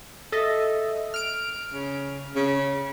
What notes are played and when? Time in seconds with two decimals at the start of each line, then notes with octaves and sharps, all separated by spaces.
0.32 A4 D#5 E5
1.14 F6 D7
1.73 C#3
2.35 C#3